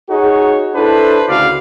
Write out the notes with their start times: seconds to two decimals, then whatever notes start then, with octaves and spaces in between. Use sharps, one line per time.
0.10 D#4 F#4 G#4 C#5
0.75 D4 E4 A4 B4 C5
1.27 D2 C#3 F#4 D5 F5